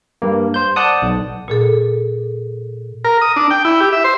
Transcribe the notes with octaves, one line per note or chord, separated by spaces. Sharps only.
G2 A#3
C5 G6
D5 F#5 A5 D#6
B1
A#2 G#4 A4
A#4
D#6
D4
G5
E4
G4
E5
C5